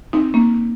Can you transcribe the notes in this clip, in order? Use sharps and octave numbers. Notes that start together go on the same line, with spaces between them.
C4 D#4
A#3 C#4